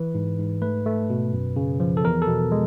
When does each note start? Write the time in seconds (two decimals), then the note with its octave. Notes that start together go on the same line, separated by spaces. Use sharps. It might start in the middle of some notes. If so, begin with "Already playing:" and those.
Already playing: E3 B4
0.14 G#2
0.38 G#2
0.62 A3 B4
0.86 A3
1.10 B2
1.33 F#2
1.56 C#3
1.80 F3
1.97 A4
2.04 E2 A#4
2.22 A4
2.27 B2
2.52 G#3